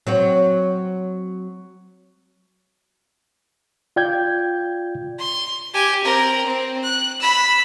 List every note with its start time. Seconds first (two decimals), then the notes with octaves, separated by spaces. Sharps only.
0.07 F#3 C4 F#4
3.96 F4 D5 G5 G6 G#6
5.19 C6
5.74 G4 G#5
6.05 C4 A#4
6.46 C4
6.84 F#6
7.20 B5 E6